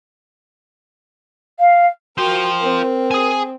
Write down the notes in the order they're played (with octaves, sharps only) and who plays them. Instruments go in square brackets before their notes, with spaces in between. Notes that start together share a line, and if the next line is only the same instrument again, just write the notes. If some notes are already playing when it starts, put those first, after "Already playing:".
[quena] F5
[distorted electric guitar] F4 C5 [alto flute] F#4 [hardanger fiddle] A#4 G5
[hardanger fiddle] C4 [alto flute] A#4
[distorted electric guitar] G#4 G#5